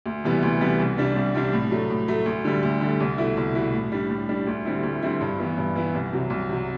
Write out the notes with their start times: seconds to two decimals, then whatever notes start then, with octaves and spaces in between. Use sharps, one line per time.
0.06 D2
0.24 C3 E3 G3 B3
0.43 D2
0.61 C3 E3 G3 B3
0.80 C2
0.97 C3 G3 D4
1.16 C2
1.34 C3 G3 D4
1.53 A2
1.71 F#3 A3
1.90 A2
2.08 F#3 A3
2.26 D2
2.45 D3 G3
2.63 D2
2.81 D3 G3
3.00 C2
3.18 B2 A3 E4
3.37 C2
3.55 B2 A3 E4
3.73 A2
3.92 G3 D4
4.10 A2
4.29 G3 D4
4.47 D2
4.65 D3 G3 C4 E4
4.83 D2
5.02 D3 G3 C4 E4
5.21 G2
5.39 E3 B3 E4
5.58 G2
5.75 E3 B3 E4
5.94 C2
6.12 C3 F#3
6.30 C2
6.49 C3 F#3